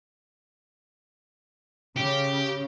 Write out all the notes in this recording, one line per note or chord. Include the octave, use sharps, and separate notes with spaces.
C#3 G4